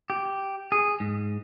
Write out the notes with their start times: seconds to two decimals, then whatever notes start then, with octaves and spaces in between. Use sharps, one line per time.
0.10 G4
0.72 G#4
1.00 G#2